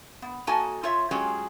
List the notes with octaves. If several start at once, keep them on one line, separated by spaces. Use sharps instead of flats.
B3
A#3 D#4 F#4 A4 G#5 A5
F4 C5 C#5 E5
F#3 G#3 C#4 F4 G4 G#4